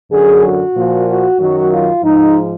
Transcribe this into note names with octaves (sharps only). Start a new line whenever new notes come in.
F#2 D3 F#3 G#4
F#4
A#2 F3
F#4
F#2 D#3 F#3 F#4
F4
G#2 F3 D#4